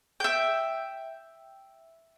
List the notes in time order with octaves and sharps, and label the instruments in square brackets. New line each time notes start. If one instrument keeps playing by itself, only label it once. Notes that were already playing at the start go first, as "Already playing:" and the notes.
[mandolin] E5 G5